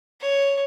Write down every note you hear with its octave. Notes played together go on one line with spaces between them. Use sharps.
C#5